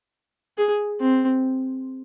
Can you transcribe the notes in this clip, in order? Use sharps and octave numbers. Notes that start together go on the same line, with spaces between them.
G#4
C4